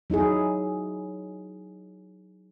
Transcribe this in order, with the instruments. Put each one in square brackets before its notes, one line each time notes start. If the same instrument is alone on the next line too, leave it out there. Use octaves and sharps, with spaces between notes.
[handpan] F#3 D#4 E4 G#4